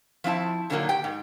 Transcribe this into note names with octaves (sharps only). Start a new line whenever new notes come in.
F3 C4 E4 A5
A#2 D3 D#3 F#3 G3 A#3
G4 G5
G#2